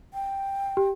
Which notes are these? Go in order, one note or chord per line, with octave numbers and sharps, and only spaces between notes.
G5
G4